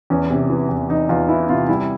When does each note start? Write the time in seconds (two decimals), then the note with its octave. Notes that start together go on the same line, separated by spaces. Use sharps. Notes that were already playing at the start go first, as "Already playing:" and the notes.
0.10 E2 C#4
0.30 C3
0.50 E3
0.69 E2
0.89 E2 D#4
1.09 E2 F4
1.29 E3 E4
1.49 C3 F4
1.69 G3 E4